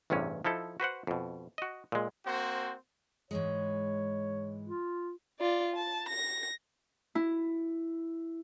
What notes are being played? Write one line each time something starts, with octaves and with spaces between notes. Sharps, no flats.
A1 E2 G2 C3 C#4
F3 D#4 E4 A4
F#4 B4 C5 F#5
F2 B2
F#4 D#5
A#2 G#3
A#3 C4 F#4 C5
G#2 E3 G#3 C#5
F4
F4 D5
A5
A#6
E4